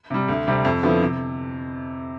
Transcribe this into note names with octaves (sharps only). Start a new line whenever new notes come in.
C3 G3
D2
C3 G3 C4
F2
D3 F3 B3 E4
C3